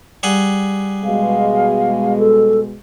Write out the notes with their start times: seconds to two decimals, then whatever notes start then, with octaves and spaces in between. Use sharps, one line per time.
0.23 G3 G#4 F#5
1.04 B2 G#3 F5
2.17 A4